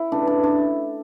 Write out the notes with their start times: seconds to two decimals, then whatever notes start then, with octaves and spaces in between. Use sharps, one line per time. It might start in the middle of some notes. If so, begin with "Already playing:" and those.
Already playing: E4
0.12 C#3 E3 A3 D4
0.27 D4
0.43 D4